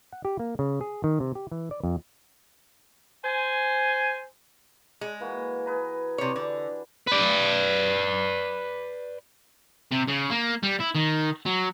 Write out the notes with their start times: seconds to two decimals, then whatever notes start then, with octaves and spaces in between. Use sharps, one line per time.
0.12 F#5
0.25 G4
0.39 A#3
0.59 C#3
0.81 G#4
1.04 D#3
1.20 C3
1.35 G4
1.52 E3
1.71 D5
1.84 F2
3.24 C5 G#5
5.01 G#3
5.20 E3 A#3 F#4
5.66 G#4 B4 A#5
6.18 C3 C#5
6.36 D3
7.07 B4 D5
9.91 C3
10.08 C#3
10.31 A#3
10.63 G3
10.81 E4
10.95 D#3
11.46 F#3